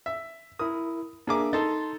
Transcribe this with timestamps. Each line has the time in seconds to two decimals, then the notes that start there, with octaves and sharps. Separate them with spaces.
0.06 E5
0.59 E4 A#4 D#6
1.27 A#3 D4 G#4 A#4 E5 D6
1.53 D#4 A4 A5 C6 A6